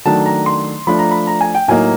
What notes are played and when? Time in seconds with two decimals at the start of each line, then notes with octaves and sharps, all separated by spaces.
0.05 D#3 F#3 A3 D4 A5
0.26 A#5
0.46 C6
0.87 F3 A3 D4 B5
0.99 A#5
1.11 B5
1.27 A#5
1.41 G#5
1.55 G5
1.68 A2 F#3 A#3 D#4 G#5